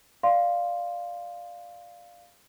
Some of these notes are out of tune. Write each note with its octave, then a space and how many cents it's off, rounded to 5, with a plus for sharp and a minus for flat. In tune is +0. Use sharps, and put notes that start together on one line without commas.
D5 +10 F5 +0 C6 +0